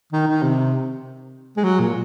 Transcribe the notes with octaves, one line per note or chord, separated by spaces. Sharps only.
D#3
D#3
C3
G#3
F#3
A#2